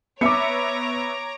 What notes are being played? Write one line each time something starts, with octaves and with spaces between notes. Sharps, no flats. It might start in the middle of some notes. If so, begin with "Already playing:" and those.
B3 C#5 E5 A#5 D6 C#7 D7